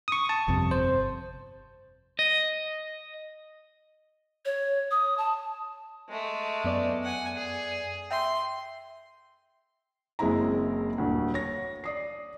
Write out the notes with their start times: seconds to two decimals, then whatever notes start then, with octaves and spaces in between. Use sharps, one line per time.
0.08 C#6 D#6
0.29 A5
0.48 G1 F2 C3
0.71 C5
2.19 D#5
4.45 C#5
4.91 D#6
5.18 A5
6.09 G#3 A3
6.64 F#2 B3 D5
7.04 F#5 G#5
7.35 G#4
8.11 E5 G5 C6
10.19 F#1 G#3 C4 E4 A#5
10.98 D#1 D2
11.34 C#5 A#6
11.84 D5 D#6 C7